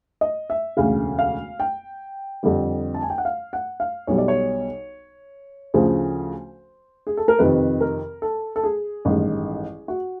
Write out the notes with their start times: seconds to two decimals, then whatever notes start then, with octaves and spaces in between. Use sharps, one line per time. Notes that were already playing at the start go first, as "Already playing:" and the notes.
0.21 D#5
0.50 E5
0.77 E1 D2 C#3 F5
1.19 F5
1.60 G5
2.43 F2 D3 G3
2.94 A5
3.02 G#5
3.10 G5
3.18 F#5
3.25 F5
3.53 F#5
3.80 F5
4.07 B1 B2 G3 C#5
4.18 D5
4.28 C#5
5.74 D2 C#3 F3 C5
7.07 G#4
7.17 A4
7.28 A#4
7.39 F2 C3 D#3 B4
7.81 A#4
8.22 A4
8.56 A4
8.64 G#4
9.05 A1 G2 D#3 G#3
9.88 F#4